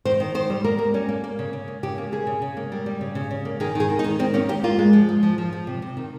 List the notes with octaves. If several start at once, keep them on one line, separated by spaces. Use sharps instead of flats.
D#3 C5
D#3
D#3 C5
G3
A#3 A#4
A#3
G3 C#4
A#3
A#3
C#3
C#3
A#3
C#3 G4
A#3
C#3 G#4
C#3
C#3
A#3
G3
G3
C#3
C#3
C#3
A#3
D#3 G#4
D#3 G#4
D#3
D#4
D#3
D#3 C4
A#3 C#4
A#3 G4
A#3 F4
G#3
F3
G#3
F3
F3
F3
C3
C3
D#3